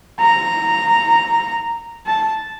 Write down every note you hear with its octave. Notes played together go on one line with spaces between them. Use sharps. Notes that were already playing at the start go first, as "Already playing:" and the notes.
A#5
A5